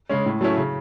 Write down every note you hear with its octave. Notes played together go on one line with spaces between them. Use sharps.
C#3 G#3 C#4
A2
F#3 A3 C#4 E4
C#3